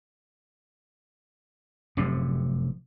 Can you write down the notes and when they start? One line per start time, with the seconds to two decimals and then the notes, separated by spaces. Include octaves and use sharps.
1.97 F1 F#2 A2 C3